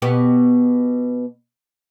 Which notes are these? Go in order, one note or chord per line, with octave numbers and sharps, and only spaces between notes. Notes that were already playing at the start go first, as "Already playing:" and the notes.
B2 B3 G4